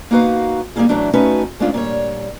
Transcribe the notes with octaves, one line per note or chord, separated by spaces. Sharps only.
A#3 D#4 F#4 B4 F5
G3 A#3 B3 D#4 F4 G#4
A2 E3 F#3 A3 D4
A3 C#4 D#4 F#4 B4
G#2 G#3 A3 C#4 D4 F4
A#2 G3 C#5